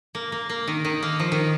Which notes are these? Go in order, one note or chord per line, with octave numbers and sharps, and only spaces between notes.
A#3
A#3
A#3
D#3
D#3
A#3
F3
D#3